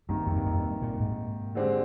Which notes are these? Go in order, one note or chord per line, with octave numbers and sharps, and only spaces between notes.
G2 C3 D#3 A#3
F2
G2
F2
G2
G2
A#2
G#2
D3 G#3 C4 G4 C5